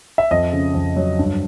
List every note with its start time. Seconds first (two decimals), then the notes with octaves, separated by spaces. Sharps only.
0.18 E5
0.31 F2 D#5
0.53 C#3
0.74 F2
0.96 F#3
1.19 G2